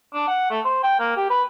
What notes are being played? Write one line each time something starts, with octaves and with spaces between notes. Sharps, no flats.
D4
F#5
A3
C5
G5
A#3
G4
B4